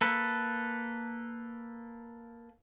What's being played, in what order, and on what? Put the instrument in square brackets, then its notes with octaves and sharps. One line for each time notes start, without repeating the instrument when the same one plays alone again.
[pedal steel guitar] A#3 A4 B4